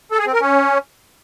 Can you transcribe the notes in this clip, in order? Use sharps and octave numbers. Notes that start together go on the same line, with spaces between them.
A4
G#4
C4
A#4
C#4